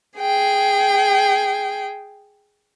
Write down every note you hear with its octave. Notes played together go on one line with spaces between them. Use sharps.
G#4 G5